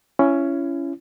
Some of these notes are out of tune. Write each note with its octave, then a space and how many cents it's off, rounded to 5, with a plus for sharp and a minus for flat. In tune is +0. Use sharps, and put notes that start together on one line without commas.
C#4 +5 E4 +30